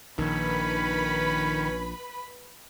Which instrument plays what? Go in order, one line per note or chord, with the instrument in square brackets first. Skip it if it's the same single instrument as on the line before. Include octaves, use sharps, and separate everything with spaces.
[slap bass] A#1 [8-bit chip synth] D#3 [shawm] C#4 [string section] B4 B5